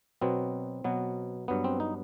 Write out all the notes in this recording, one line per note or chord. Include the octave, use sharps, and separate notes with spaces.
B2 F#3 B3 C4
B2 F#3 B3
G2 F#3 B3
C4
D#4